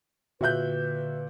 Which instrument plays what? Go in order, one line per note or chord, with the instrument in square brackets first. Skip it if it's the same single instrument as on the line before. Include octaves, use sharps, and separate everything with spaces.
[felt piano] A#2 F#6 [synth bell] D3 [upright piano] F#4 E5 G6 [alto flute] B4